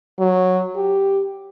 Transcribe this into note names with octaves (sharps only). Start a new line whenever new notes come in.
F#3
G4